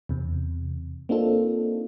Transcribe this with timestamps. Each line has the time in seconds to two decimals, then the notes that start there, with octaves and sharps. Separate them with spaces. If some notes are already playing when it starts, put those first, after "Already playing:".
0.09 E2 C3
1.09 A#3 C4 D4 D#4 F4 A4